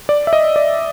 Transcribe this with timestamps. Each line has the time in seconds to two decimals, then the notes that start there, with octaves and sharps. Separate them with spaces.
0.09 D5
0.27 E5
0.33 D#5
0.56 D5